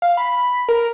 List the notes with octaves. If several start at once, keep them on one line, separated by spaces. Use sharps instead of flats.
F5
B5
A#4